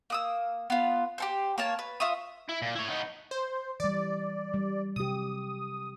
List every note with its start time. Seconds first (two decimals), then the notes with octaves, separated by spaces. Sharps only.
0.10 A#3 D#6 E6
0.70 B3 F4
1.18 G4 A4 C5
1.58 A#3 C#5 A5
1.79 B4
2.00 F4 E5 C#6 D#6
2.49 E4
2.62 A#2
2.75 E4 C#5
2.88 B3 D#4
3.31 C5
3.80 E3 G3 D5
4.54 G3
4.96 C3 F#3 G4 D#6